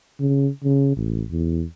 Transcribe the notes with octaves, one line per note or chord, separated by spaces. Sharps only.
C#3
C#3
A1
E2